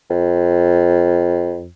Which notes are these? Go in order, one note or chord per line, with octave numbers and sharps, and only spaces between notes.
F2